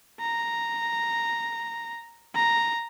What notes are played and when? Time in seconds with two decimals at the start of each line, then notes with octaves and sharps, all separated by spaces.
0.20 A#5
2.35 A#5